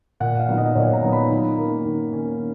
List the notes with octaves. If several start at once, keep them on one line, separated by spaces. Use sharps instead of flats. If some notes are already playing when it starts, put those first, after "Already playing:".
A#2 F#5
F5
F#3 B3 D#4
D#5
A#2 C#5
A#5
F#3 B3 D#4
B5
D#3
A#3 C#4
D#3
A#3 C#4